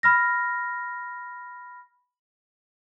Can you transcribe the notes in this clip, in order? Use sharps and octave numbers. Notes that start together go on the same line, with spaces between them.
B5 F6 A#6